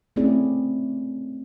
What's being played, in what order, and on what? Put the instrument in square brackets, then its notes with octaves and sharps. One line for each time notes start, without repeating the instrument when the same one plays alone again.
[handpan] A3 C4 C#4 E4 G#4 D5